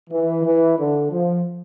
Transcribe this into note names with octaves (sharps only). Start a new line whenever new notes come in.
E3
E3
D3
F3